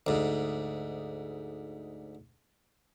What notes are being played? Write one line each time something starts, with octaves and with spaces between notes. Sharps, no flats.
D2 G#2